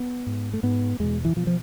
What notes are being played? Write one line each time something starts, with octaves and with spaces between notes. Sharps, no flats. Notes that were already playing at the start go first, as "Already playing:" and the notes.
Already playing: B3
G#2
A3
G#2 B3
E2 B2 G#3
E3
B2 F3
F3